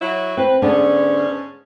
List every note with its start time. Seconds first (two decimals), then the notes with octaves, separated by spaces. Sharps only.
0.02 F#3 E4
0.37 C4 B4
0.62 G#2 D3 B3 C#4 D4